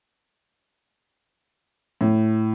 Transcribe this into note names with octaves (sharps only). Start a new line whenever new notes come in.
A2